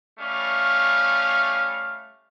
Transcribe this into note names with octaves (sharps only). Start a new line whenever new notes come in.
G3 A3 C#4 F5